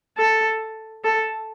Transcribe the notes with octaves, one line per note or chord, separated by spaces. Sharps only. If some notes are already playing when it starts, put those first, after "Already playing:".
A4
A4